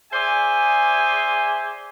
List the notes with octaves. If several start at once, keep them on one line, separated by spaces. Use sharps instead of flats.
G#4 C5 D5 E5 G#5